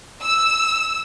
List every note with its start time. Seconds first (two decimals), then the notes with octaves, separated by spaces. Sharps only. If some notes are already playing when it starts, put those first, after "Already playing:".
0.23 E6